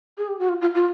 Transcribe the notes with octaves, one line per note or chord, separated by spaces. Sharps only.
G#4
G4
F#4
F4
F4
F4